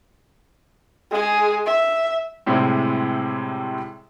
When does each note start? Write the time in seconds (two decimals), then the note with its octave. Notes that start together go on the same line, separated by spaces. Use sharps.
1.11 G#3 G#4
1.66 E5
2.46 A2 C3 G3 G#3 C4 E4